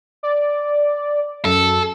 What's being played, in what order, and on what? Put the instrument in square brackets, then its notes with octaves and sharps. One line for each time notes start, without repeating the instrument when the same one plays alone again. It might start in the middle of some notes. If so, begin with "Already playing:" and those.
[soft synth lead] D5
[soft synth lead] F#2 [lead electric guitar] A4